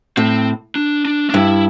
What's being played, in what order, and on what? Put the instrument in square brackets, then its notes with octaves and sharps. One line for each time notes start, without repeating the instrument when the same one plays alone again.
[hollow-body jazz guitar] A2 [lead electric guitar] C4
[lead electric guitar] D4
D4
D4
[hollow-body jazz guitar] G2 [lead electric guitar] E4